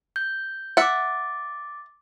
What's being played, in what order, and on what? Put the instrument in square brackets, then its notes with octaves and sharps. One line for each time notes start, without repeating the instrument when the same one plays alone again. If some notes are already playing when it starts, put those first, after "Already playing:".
[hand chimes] G6
[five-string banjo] E5 F#5 [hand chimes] D6 A6